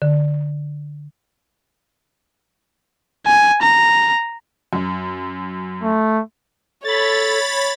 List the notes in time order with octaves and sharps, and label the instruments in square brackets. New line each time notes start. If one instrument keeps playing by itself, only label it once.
[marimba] D3
[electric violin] G#5
A#5
[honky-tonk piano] F#2
[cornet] A3
[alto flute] A4 [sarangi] C#5 [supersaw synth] B5 A6